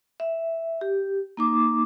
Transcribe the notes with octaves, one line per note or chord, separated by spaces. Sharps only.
E5
G4
A#3 D#4 D6